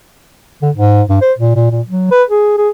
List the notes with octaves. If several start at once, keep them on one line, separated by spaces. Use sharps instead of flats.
D3
G#2
G2
C5
A#2
A#2
A#2
F#3
B4
G#4
G#4